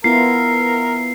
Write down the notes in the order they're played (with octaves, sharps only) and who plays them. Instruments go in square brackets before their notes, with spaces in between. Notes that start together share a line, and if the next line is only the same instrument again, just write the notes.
[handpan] B3 E4 F4 [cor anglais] A#4 [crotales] C7